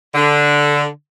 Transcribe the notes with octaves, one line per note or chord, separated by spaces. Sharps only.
D3